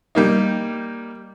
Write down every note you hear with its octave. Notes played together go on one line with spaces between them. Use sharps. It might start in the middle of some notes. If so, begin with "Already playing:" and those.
G3 A#3 D#4